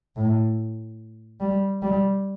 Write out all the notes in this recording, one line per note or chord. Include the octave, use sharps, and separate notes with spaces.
A2
G3
G3